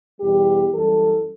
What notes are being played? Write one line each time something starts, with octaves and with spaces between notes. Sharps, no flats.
E2 B2 G3 G4
F#2 E3 G3 A4